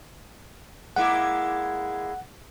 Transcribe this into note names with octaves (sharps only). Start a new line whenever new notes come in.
G#3 A#3 E4 F#5